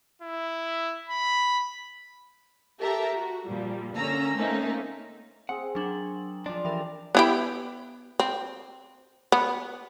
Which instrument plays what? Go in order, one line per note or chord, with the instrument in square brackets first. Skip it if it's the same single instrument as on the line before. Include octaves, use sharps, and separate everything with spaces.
[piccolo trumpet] E4
B5
[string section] G4 A4 A#4 E5 A5 A#5
F#4
A#2 F3 G3
D3 A#3 C#4 A#5 E6
A3 A#3 C4 C#4 D#4
[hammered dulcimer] C4 G#4 [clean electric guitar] F#5
[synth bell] F#3 D4 F#7 [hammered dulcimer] A#4
[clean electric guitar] F3 D4 [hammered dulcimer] D5 C6
[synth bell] E3 A#4 [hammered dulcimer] G4 A4
[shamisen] B3 E4 G4
C4
B3